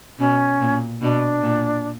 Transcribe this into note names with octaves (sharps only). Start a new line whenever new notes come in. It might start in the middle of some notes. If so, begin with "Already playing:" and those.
B2 C#4
A#2
B2 D4
A#2